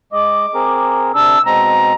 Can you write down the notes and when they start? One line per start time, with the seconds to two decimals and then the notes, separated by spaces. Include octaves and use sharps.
0.13 G#3 D#5 D6
0.55 C4 G#4 A#4
1.15 C3 D4 E6
1.46 B2 G#3 C4 A#5